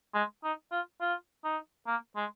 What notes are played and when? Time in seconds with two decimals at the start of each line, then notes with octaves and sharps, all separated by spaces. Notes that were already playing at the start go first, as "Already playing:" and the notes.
0.14 G#3
0.44 D#4
0.72 F4
1.01 F4
1.44 D#4
1.87 A#3
2.16 G#3